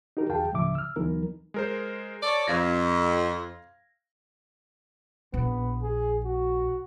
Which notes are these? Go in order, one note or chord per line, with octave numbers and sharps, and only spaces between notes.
D#4 F#4 G4 A#4
E2 F#4 G#4 F5 G5 A5
D2 A2 C#3 F3 E5 D6
E6 F6
D2 E3 F#3 B3 D#4 A#4
G#3 A#4 C5
A4 C#5 D5
F2 F5 G#6 A#6
A#1 B3
G#4
F#4